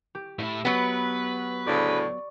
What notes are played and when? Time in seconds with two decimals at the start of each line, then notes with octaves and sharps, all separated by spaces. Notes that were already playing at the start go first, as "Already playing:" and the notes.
0.15 G4
0.39 A2 E4 E5
0.65 F#3 B3 B4 B5
1.67 D2 A2 C#3 D5 C#6